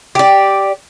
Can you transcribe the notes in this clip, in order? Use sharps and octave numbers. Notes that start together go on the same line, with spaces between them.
G4 D5